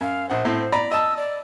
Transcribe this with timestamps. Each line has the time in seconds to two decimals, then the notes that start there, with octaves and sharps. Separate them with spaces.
0.01 F#2 F5
0.30 A#1 C5 F#5
0.45 A2 C4
0.72 D5 A#5 B5
0.91 D#5 A5 E6
1.17 D5